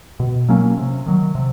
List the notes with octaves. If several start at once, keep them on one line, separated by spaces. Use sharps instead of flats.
B2
F#3 A#3 C#4
C3
D#3 F#3
C3